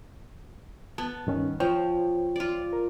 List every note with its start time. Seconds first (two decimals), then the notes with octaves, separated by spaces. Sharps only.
0.98 B3 A5
1.27 G2 D#3 C#4
1.60 F3 C5 C#5 G5
2.36 F4 D5
2.73 A#4